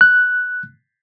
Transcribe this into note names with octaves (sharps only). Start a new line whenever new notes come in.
F#6